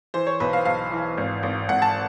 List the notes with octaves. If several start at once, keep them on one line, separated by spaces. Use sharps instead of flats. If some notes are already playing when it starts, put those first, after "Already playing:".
E3 C5
C#5
B1 B4
F5
B1 F5
E3
G#1
G#1
G#1 F#5
A5